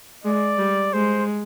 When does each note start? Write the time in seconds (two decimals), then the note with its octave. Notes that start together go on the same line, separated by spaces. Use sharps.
0.24 G#3 D5
0.58 G3
0.93 G#3 C5